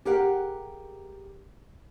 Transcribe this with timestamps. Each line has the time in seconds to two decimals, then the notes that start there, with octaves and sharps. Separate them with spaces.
0.05 G4 G#4 A#4 F5 F#5